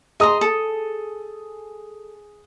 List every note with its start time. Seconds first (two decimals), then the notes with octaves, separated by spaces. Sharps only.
0.20 G#4 D#5 A#5 C6 D#6
0.41 A4